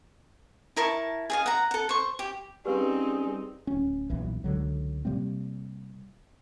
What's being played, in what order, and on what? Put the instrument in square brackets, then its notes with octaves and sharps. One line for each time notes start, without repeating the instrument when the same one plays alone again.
[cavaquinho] E4 A#4 A5 C#6
G#4 D#5 F5
F#5 A#5
A4 F#5
C5 C#6
G4
[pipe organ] G3 C#4 [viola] C4 D#4 [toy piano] G4 B4 F5 [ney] G#4
[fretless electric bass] D1 C#4
D#1 B1 E3
C#2 D3 F#3
C3 G3 A#3 C4